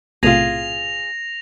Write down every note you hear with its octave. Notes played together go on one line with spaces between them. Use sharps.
B1 A2 C3 F4 G#4 A#6 F7